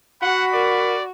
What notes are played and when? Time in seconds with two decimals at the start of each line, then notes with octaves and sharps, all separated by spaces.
0.22 F#4 F#5 B5
0.53 A#4 D5